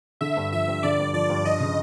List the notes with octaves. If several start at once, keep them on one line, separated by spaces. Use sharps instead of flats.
D3 E5
G2
F3 E5
G2
D3 D5
G2
F3 D5
G2
F3 D#5
C#3